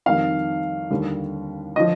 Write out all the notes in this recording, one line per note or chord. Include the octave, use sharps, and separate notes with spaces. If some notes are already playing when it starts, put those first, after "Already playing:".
F2 D#3 G3 F5
D#2 D3 G3
D3 F3 D#5